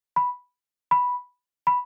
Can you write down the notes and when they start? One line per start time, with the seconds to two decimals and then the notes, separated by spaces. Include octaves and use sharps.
0.16 B5
0.91 B5
1.67 B5